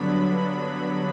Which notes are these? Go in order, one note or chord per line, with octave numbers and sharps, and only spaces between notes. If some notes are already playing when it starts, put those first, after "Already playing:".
Already playing: G2 D3 F#3 B3 D4 B5